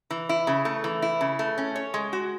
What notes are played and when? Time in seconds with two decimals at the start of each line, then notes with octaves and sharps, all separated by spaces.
0.11 E3
0.29 E4
0.47 C#3
0.65 A3
0.84 E3
1.02 E4
1.21 C#3
1.39 A3
1.58 C#4
1.76 C#5
1.94 G#3
2.13 F#4